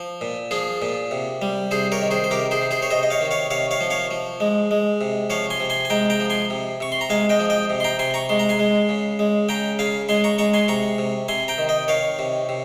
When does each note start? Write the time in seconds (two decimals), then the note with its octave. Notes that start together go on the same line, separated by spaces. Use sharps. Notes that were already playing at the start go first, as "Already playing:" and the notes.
Already playing: F3
0.21 A#2
0.51 F3 F4 G#4
0.82 A#2
1.11 C3
1.42 G3
1.71 C3 G#4 C5
1.92 A#4 C#5
2.02 D#3
2.11 G#4 C5
2.24 C5
2.31 C3 G4 A#4
2.51 G#4 C5
2.61 C3
2.71 G#4 C5
2.82 C#5
2.91 C3 C5 D#5
3.03 D#5
3.10 C#5 F5
3.21 D#3
3.31 C#5 F5
3.51 C3 C#5 F5
3.71 C#5 F5
3.81 F3
3.90 C#5 F5
4.11 F3
4.40 G#3
4.71 G#3
5.01 C3
5.30 F3 C#5 F5
5.50 G#5 C6
5.60 C3
5.70 G#5 C6
5.85 G#5
5.90 G#3 G5 A#5
6.10 G5 A#5
6.20 F3
6.30 G#5 C6
6.50 C3
6.80 C3 C#6
6.92 C6
7.01 A#5
7.10 G#3 F5 G#5
7.29 D#5 G5
7.40 F3
7.50 D#5 G5
7.70 C3
7.80 C6
7.84 G5 A#5
7.99 C3 G#5 C6
8.14 A#5 C#6
8.29 G#3 C6
8.39 A#5
8.49 G#5 C6
8.59 G#3
8.89 C#3
9.19 G#3
9.49 C#3 G5 A#5
9.79 C#3 F5 G#5
10.09 G#3 G#5 C6
10.24 A#5 C#6
10.38 G#3 A#5 C#6
10.53 G#5 C6
10.68 C3 A#5 C#6
10.98 C3
11.28 C3 G#5 C6
11.48 G5 A#5
11.58 D#3
11.69 D#5 G5
11.88 D#3 C#5 F5
12.19 C3
12.49 C3